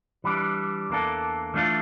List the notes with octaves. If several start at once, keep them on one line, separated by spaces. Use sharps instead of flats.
E3 G3 D4
E2 E3 A#3 D4 A4
E3 A3 D4 F4 A4